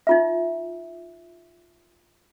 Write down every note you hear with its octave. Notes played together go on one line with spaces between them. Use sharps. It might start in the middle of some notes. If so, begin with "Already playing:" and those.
D#4 F4 E5